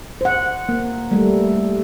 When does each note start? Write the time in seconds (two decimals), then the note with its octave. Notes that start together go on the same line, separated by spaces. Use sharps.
0.21 C5 F#5
0.69 A#3
1.11 G3 A3